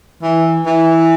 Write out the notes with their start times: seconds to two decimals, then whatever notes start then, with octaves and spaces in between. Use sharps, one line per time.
0.23 E3
0.67 E3